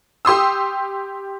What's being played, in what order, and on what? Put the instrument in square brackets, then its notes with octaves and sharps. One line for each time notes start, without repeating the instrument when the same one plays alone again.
[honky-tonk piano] G4 C6 D#6 E6